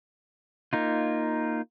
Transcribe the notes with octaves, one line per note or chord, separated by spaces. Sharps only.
A#3 D#4 F4